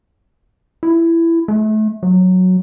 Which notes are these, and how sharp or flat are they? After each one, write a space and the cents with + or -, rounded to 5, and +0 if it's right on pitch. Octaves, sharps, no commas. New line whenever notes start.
E4 +15
A3 -30
F#3 -5